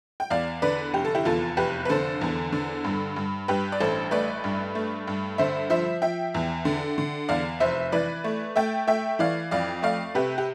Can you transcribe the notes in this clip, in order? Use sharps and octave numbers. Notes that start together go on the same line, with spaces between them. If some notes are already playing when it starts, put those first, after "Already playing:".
G5
E2 D5 F5
D3 B4 D5
F1 G4
A4
E4 G4
E2 F4 A4
F1 G4 B4
B4
D3 A4 C5
E2
D3
G2
G2
G2 G4 B4
D5
A1 A4 C5
A3 B4 D5
G2
A3
G2
D3 C5 E5
F3 C5 E5
F3 E5 G5
E2
D3
D3
E2 D5 F5
F1 C5 E5
E3 B4 D5
A3
A3 E5 G5
A3 E5 G5
E3 D5 F5
F2 D5 F5
A3 D5 F5
C3 G4 B4
G4